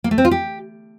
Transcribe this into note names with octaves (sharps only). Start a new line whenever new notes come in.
A#3
A3
C4
F4
G4